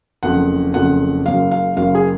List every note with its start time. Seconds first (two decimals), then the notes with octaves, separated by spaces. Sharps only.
0.23 F#1 F2 C#3 F#5
0.74 F#1 F2 C#3 F#5
1.25 F#1 F#2 C#3 F5
1.51 F5
1.76 F#1 F#2 C#3 F5
1.95 G#4